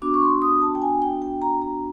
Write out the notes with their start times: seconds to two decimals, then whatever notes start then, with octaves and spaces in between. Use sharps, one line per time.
0.02 B3 D4 F#4 D6
0.14 C#6
0.22 C6
0.42 D#6
0.62 A5
0.75 G5
0.82 G#5
1.02 G5
1.22 G5
1.42 A#5
1.62 A#5